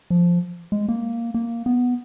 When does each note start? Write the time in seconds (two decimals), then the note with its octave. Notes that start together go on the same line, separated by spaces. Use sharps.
0.10 F3
0.72 G#3
0.89 A#3
1.34 A#3
1.66 B3